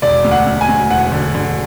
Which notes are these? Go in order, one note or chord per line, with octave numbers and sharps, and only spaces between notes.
E1 D5
D2
F#5
D2
G#5
D2
E1 F#5
D3
D3